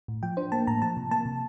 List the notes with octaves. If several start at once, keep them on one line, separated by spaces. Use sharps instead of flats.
A2
F3 G5
D4 C5
A#3 A5
A2 A#5
F3 A5
C3
A#3 A5
C3